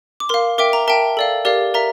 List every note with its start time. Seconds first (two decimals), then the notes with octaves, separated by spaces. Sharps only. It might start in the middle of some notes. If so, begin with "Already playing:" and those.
0.20 D6
0.29 A#4 F5 C6
0.58 A#4 E5 G5 D6
0.73 A#5
0.88 A#4 E5 G5 A5
1.17 A4 D5 F5
1.45 G4 A#4 D5 F5
1.74 A#4 E5 A#5